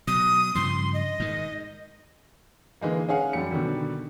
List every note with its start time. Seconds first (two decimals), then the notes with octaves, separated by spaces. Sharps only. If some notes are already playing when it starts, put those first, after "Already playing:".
0.07 B2 F#3 D#6
0.55 G2 C#3 F3 C6
0.94 D#5
1.20 G#2 D#3
2.81 D3 E3 G#3 A#3
3.09 C#4 G#4 F5 F#5
3.33 F#2 G3 C#7
3.52 B2 D3 D#3 G3